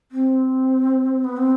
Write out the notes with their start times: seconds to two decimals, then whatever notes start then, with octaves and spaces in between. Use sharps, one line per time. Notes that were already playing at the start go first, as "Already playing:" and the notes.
0.11 C4
1.24 B3
1.37 C4